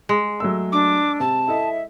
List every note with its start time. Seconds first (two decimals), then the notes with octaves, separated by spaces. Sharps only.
0.09 G#3
0.40 F#3 A3 E6
0.72 D4 D6
1.20 C3 A5
1.48 E4 A4 D#5 E5